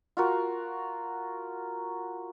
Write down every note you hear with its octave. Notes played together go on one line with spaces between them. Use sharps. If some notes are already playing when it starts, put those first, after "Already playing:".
F4 F#4 A#4